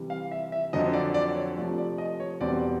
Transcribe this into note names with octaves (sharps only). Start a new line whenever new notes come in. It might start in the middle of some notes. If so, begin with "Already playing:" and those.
Already playing: C3 E3 G3
F5
E5
E5
F2 D3 F#3 D#5
D5
D5
C#5
C3 F3 A3 D5
D5
D#5
C#5
E2 B2 G3 C4 D5